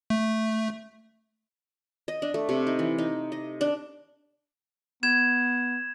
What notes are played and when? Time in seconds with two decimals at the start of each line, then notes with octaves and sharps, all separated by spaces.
0.10 A3
2.08 D#5
2.22 D4
2.34 A3
2.49 C3
2.67 D#4
2.79 E3
2.98 D#4
3.32 D#5
3.61 D4
5.03 B3 G#6 E7